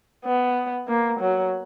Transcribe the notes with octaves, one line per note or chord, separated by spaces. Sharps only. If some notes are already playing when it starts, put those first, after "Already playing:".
B3
A#3
F#3